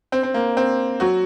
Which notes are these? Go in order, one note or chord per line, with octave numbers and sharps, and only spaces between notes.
C4
C4
A#3
C4
F#3 F#4